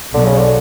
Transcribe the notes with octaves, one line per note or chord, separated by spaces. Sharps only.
B1 B2 D3 F#3
C#3
D3